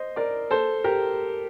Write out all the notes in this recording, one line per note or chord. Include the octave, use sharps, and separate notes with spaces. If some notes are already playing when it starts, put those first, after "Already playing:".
Already playing: C5 D#5
A#4 D5
A4 C5
G4 A#4